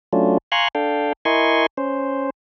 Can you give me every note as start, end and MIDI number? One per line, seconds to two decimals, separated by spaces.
0.13 0.38 54
0.13 0.38 57
0.13 0.38 61
0.13 0.38 62
0.13 0.38 65
0.52 0.68 77
0.52 0.68 80
0.52 0.68 82
0.52 0.68 84
0.52 0.68 85
0.52 0.68 90
0.75 1.13 62
0.75 1.13 69
0.75 1.13 77
0.75 1.13 79
1.25 1.66 64
1.25 1.66 70
1.25 1.66 75
1.25 1.66 80
1.25 1.66 84
1.25 1.66 85
1.78 2.30 61
1.78 2.30 72